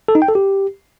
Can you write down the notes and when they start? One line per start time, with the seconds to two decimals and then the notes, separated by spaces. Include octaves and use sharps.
0.08 A4
0.15 D#4
0.22 G5
0.29 A4
0.35 G4